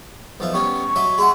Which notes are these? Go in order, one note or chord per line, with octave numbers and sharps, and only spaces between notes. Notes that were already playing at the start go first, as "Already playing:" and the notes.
B1 F3 E5
G3 B3 C#4 C#6
F#3 D#5 E5
G#4 E5 F#5 C6